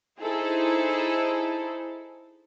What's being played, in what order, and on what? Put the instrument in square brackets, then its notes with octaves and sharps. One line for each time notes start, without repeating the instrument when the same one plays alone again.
[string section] D#4 E4 G#4 A4 C5